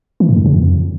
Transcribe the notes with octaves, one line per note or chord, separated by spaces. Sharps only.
E3
G#2
F2
C#3
F2